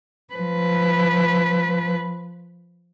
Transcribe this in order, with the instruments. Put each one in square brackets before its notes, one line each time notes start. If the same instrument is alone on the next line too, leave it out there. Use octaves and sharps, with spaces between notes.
[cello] F3 B4